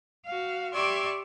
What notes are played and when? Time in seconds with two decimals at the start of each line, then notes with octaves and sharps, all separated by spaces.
0.25 F#4 F5
0.72 G4 D5 E5 C6 C#6 G#6